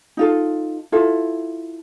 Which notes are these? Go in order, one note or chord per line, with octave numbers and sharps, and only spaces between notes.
D#4 F4 A4
E4 F4 A4